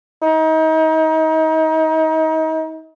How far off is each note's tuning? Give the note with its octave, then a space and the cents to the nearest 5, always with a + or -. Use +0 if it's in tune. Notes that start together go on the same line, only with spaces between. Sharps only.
D#4 +35